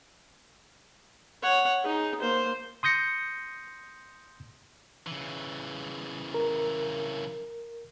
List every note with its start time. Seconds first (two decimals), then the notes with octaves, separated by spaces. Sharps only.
1.43 C#5 F#5
1.83 D#4 G#4
2.21 A#3 C5
2.83 C6 D#6 G6 A#6 C#7
5.07 C#3 E3
6.34 A#4